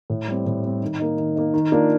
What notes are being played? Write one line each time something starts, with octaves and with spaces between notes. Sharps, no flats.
A2
G3 C4
A2
G3 C4
D#3
A#3 D#4
D#3
A#3 D#4
D#3
A#3 D4 F4